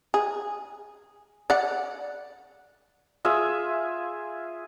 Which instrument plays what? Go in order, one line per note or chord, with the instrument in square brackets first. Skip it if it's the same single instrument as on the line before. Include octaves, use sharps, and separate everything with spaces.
[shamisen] G#4
D5 F#5
[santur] F4 G#4 E5